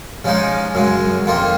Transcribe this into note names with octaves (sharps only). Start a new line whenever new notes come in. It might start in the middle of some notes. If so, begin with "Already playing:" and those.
C#3 F3 G#3 D#4
F#2 C#3 G#3
F2 D#3 A#3 F4